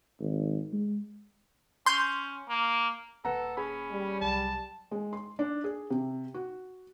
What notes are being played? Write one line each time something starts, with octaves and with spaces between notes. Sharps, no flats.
G#1
G#3
C#4 C6 G6
A#3
D#1 A#3 A4 B4 F#5 A#5
C#4 G#4 G#5 B5
G3
C2 F#3 A5
G#3
C6
D4
G#4
C3
F#4